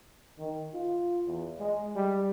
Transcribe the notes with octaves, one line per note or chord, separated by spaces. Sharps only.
D#3
F4
E2
G#3
G3